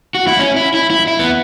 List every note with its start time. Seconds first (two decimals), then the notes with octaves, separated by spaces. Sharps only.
0.15 F#4
0.27 E4
0.39 C#4
0.56 E4
0.74 E4
0.90 E4
1.07 E4
1.19 B3